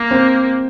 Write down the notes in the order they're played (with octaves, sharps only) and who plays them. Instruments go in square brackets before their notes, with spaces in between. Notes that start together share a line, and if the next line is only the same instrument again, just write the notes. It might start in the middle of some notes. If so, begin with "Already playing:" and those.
Already playing: [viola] A#3
[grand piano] C4